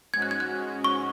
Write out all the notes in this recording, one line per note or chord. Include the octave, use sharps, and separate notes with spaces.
G#2 G#3 C#4 F#4 G#6
F#6
G#6
F#6
C#6